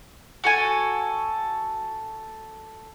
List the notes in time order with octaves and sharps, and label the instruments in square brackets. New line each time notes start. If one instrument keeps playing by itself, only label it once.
[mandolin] F#4 A4 G#5